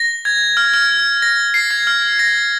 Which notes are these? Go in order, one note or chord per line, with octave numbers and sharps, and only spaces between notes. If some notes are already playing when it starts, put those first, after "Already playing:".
Already playing: A#6
G#6
F6
F6
A#6
C7
G#6
F6
A#6